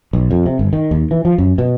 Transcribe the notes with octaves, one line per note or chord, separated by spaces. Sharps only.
B1
F2
C3
G1
D#3
D#2
E3
F3
F#2
B2